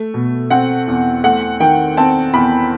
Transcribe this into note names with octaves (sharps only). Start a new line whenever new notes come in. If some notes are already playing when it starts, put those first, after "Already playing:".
Already playing: A3
B2
C4 F#5
E2
A3 F#5
D#3 G5
C4 A5
E2 B5